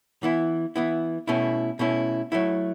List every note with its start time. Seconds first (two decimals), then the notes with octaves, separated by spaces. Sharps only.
0.23 E3 B3 E4
0.76 E3 B3 E4
1.27 B2 A3 C#4 E4
1.79 B2 A3 C#4 E4
2.32 F#3 A3 E4